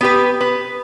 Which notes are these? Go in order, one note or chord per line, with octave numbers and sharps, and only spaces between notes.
B3 G4 B4
B4